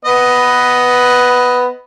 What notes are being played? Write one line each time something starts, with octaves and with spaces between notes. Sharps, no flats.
B3 B4 D#5